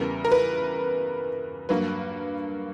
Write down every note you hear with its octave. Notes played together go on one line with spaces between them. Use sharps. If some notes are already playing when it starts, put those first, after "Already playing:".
Already playing: E2 C#3 G3 B3 A#4
A#4
B4
G2 F#3 A#3 B4